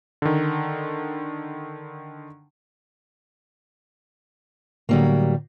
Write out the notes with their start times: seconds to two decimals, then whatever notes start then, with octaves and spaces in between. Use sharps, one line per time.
0.22 D3 D#3
4.89 A2 D3 F#3 G3 A#3